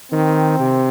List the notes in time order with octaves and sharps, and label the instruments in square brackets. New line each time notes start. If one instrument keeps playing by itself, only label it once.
[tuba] D#3 [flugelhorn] C4
[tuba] C3